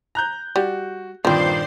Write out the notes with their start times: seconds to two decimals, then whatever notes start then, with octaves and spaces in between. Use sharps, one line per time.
0.15 A#5 F#6 G6
0.56 G3 F#4
1.25 G2 A#2 D#3 F3 C4 C5 D5 C6